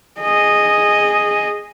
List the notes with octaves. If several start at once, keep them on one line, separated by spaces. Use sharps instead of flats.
G#4 D#5